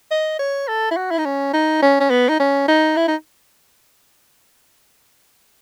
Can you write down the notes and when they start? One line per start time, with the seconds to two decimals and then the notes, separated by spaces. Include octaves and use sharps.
0.11 D#5
0.39 C#5
0.68 A4
0.91 E4
0.97 F#4
1.11 E4
1.18 D#4
1.25 C#4
1.53 D#4
1.82 C#4
2.00 C#4
2.10 B3
2.29 D#4
2.40 C#4
2.68 D#4
2.97 E4
3.08 D#4